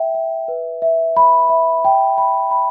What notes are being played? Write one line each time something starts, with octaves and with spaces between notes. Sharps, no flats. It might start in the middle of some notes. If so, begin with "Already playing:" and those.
Already playing: E5 G5
E5
B4
E5
B5
E5
G5
B5
B5